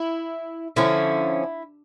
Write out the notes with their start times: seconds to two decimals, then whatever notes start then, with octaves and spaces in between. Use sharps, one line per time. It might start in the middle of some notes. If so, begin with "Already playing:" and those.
Already playing: E4
0.76 D3 F3 C#4 E4